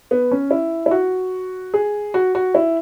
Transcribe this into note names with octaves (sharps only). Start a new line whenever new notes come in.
B3
C#4
E4
E4
F#4
G#4
F#4
F#4
E4